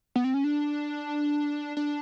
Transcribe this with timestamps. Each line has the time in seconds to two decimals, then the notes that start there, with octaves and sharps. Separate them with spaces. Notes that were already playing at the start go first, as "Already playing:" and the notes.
0.16 B3
0.24 C4
0.34 C#4
0.44 D4
1.77 D4